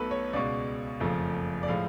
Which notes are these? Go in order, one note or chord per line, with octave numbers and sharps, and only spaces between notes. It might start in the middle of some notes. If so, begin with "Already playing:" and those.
Already playing: B1 B2 A3 A4 B4
C#5
C#2 B2 G#3 D5
F#1 F2 F3 A3
D5
A2 F3 G#3 F5